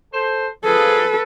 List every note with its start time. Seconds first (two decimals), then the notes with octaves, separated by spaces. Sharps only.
0.12 A4 C5
0.64 F3 G#4 A4 B4